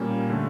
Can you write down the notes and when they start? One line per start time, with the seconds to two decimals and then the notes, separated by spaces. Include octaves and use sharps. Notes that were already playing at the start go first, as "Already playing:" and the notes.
Already playing: A#2 G3 A#3 C#4
0.30 D3 A3